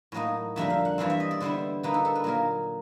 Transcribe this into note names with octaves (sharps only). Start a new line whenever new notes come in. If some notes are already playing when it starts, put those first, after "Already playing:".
A2 F#3 A#3 D#4 D#5
F2 D3 G3 A#3 D4 E5
F5
F#5
G2 E3 G3 C4 F5
E5
D#5
D5
D3 G3 B3 E4 C5
D3 G3 A#3 D#4 B4
A4
A4
B4
A#2 F#3 A#3 A#4